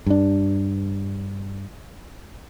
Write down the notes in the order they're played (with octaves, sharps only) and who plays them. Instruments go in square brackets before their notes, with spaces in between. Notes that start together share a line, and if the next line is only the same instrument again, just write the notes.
[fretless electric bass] G2 D4